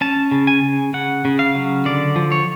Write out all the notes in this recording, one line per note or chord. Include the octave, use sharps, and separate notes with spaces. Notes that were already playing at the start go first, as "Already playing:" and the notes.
C#4 A5
C#3
G#5
C#3
C#3 F#5
C#3
F5
F#3
D3 D5
F3
C#5